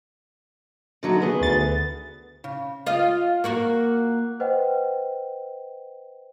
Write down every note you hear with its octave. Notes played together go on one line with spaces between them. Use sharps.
D3 F#3 D#4
D#3 B3 G#4
D2 A6
C#3
F4 D#5
A#3 F#4 A#4
B4 C5 D#5 F#5 G5